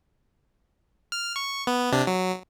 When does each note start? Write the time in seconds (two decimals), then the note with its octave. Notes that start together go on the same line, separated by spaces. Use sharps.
1.12 F6
1.36 C#6
1.67 B3
1.92 C3 D4
2.07 F#3